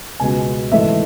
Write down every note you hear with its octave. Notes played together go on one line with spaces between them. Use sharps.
C#2 B2 G#3 B3 G#5
G#1 G#2 E3 A3 E5